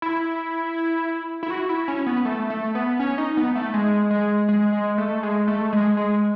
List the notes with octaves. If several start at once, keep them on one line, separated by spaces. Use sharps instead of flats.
E4
E4
F#4
E4
C#4
B3
A3
A3
B3
C#4
D#4
B3
A3
G#3
G#3
G#3
G#3
A3
G#3
A3
G#3
G#3